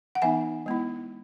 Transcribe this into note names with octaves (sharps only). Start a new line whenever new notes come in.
F#5
E3 B3 D#4 E5 G#5
G#3 B3 E4